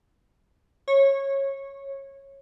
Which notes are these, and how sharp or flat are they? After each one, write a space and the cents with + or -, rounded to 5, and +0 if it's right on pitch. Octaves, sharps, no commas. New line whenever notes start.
C#5 -20